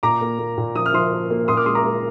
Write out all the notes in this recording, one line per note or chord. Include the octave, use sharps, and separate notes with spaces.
A#2 A#5 D6
A#3
A#3
A#2
F3 D#6
F6
F3 C6 D#6
A#3
A#3
A#2 C6 D#6
D6 F6
G#3 C6 D#6
A#5 D6
G#3